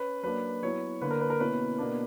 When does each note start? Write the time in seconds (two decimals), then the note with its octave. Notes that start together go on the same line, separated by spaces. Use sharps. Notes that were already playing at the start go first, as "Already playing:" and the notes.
Already playing: C#4 B4
0.23 F#3 A#3 D4 B4
0.63 F#3 B3 E4 C#5
1.01 D3 A#3 D4 B4
1.11 A#4
1.21 B4
1.30 A#4
1.40 B2 A#3 C#4 E4 B4
1.78 B2 A#3 D4